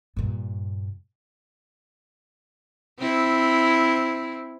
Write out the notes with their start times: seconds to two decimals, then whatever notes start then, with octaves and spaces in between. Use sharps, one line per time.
0.17 G2 A#2
2.99 C4 E4